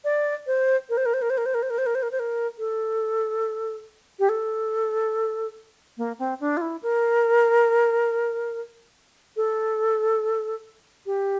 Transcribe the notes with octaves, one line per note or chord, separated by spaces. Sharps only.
D5
C5
A#4
C5
A#4
C5
A#4
C5
A#4
C5
A#4
C5
A#4
C5
A#4
C5
A#4
C5
A#4
A4
G4
A4
A#3
C4
D4
F4
E4
A#4
A4
G4